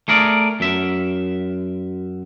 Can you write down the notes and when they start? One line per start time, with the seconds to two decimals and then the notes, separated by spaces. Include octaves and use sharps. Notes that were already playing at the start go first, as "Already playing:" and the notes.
0.08 A3 G#4 A#4 D5
0.60 F#2 E5